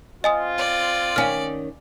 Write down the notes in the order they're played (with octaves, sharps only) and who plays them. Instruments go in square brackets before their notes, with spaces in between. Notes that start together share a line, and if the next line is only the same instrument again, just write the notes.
[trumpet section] C4 F4 [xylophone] D#5 G#5 D#6
[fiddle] D5
[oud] D#3 C#4 [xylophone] F5 G#5 F6